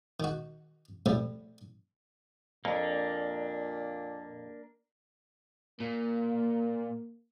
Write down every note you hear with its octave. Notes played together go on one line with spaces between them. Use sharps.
D#3 F#4
A2 C3 F3 G3
F2 A#2 A#3 D4
A#2 A#3